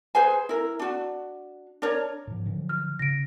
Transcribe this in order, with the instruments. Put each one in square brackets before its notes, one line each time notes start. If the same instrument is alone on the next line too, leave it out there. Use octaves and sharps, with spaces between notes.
[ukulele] G#4 B4 C5 G#5
E4 A#4
D4 F#4
D4 A#4 C#5
[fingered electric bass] G#2 F3
D3 F3 F#3
[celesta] F6
[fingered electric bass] C#3 [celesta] A#6 D7